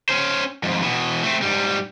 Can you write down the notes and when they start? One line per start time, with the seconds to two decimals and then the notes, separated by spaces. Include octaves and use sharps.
0.09 C#4 C5
0.63 F2 G#2
0.82 B2 E3
1.23 A3 C4
1.42 G#2 G3